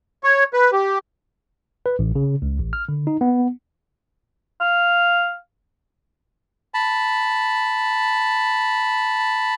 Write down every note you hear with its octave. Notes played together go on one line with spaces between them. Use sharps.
C#5
B4
G4
B4
A1
C#3
C#2
A1
F6
D3
D#4
B3
F5
A5 B5